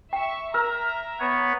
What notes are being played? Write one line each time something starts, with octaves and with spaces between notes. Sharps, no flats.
E5 G5 C#6
A#4 E5 A#5 E6
B3 B4 C#5